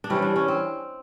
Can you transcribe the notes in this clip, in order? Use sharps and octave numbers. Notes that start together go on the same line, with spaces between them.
D4
C3 E3 G3 C#4
D4
C#4
C4